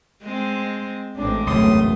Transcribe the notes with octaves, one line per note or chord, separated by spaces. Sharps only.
G#3 C4
A1 G#3 C4 D4
E1 C#2 F#2 A2 A3 C6 D#6